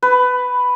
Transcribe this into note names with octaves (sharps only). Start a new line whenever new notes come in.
B4